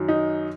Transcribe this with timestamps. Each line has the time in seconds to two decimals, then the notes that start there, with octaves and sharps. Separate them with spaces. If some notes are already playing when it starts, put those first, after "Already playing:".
Already playing: F#2 D#3 F#3
0.08 D#4